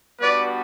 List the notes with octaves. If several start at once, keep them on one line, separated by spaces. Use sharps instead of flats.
G3 B3 D4 F#4 B4 D5